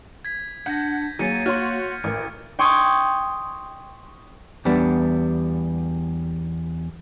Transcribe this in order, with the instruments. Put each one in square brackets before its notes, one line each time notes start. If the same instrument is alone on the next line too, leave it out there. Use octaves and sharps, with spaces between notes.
[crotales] G#6 B6
[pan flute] D4 [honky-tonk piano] F#5 [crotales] G6 A#6
[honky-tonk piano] F#3 G#4 [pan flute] A#3 [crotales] A6 C#7 D#7
[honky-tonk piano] F#4 C#5 C6 [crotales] F6
[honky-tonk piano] A1 [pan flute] A#4 [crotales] C#7
[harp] G5 C6 C#6 D#6 G#6
[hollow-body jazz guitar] E2 G3 B3 D4